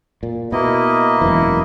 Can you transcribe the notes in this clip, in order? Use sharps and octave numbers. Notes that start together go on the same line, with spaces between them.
A#2
B2 A#3 E4 D#5
E1 F#2 E3